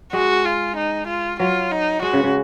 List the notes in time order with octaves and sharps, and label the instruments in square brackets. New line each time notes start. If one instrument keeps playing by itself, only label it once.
[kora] G#3 [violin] F#4
[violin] F4
D#4
F4
[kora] F#3 [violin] F4
[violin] D#4
[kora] G#3 [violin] F#4
[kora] C#3
C#3